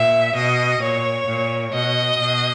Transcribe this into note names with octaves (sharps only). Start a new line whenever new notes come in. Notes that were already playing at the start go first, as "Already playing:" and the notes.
Already playing: A#2 E5
B2 D#5
A#2 C#5
A#2
B2 D#5
B2